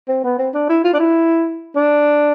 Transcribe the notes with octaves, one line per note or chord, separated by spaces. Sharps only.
C4
B3
C4
D4
E4
F4
D4
E4
D4